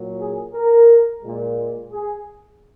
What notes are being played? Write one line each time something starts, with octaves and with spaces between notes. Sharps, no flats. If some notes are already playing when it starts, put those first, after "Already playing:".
Already playing: A#2 F#3
G#4
A#4
A#2 G#3
G#4